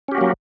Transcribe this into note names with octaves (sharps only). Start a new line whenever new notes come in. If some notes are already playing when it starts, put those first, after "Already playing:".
F#3 A#3 C#4 F#4 G4